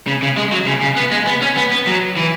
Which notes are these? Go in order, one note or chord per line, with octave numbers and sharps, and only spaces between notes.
C#3
C#3
G#3
F#3
C#3
C#3
B3
G#3
B3
C#4
B3
B3
F#3
E3